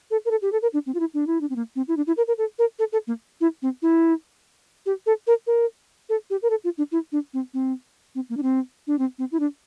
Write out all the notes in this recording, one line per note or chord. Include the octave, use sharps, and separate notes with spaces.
A4
A#4
A4
G4
A4
A#4
D4
C4
F4
E4
D4
E4
D4
C4
A#3
C4
E4
D4
E4
A#4
A#4
A4
A#4
A4
A4
A#3
E4
C4
E4
G4
A4
A#4
A#4
A4
G4
A#4
A4
F4
D4
E4
D4
C4
C4
C4
A#3
D4
C4
D4
C4
C4
E4
D4